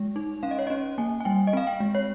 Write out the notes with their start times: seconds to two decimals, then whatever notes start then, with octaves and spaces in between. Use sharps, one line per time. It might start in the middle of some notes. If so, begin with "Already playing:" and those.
Already playing: G#3
0.16 D#4
0.43 C#4 F5
0.51 D#5
0.59 C#5
0.67 C#4 D#5
0.98 A#3 G#5
1.21 G#5
1.25 G3 G5
1.47 D#5
1.53 C4 F5
1.67 G5
1.80 G#3
1.95 C#5